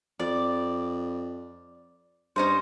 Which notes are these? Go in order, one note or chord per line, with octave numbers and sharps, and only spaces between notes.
F2 D5
G2 C#4 D#4 C5